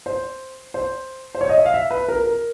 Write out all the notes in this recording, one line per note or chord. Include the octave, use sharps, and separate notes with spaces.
C5
C5
C5
C#5
D#5
E5
F5
E5
B4
A#4
A#4